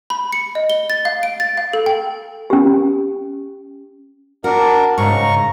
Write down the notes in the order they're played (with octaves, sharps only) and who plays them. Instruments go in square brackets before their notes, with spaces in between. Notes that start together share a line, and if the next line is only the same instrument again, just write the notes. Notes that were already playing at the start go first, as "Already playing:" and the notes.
[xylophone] B5
C#7
D#5
G7
A6
F5
D7
A6
F5
A4
G5
[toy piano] C#4 G4
[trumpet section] D4 [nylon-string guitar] F#4 [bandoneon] A#4
[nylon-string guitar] G#2 C#3 [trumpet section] A#5 [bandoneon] C#6